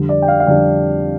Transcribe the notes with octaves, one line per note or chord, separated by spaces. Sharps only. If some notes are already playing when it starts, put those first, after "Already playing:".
Already playing: F2 D3 G3 D4
D5
G5
F5
F5
F2 D3 G3 D4 D5 G5